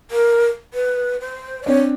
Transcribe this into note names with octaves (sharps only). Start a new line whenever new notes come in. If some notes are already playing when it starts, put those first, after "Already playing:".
A#4
B4
C5
D5
C4 D4 C#5